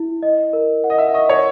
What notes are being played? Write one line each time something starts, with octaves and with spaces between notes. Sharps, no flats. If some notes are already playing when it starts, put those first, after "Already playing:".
Already playing: E4
D#5
A#4
F#5
D#5
E5
D#5 C#6
C#5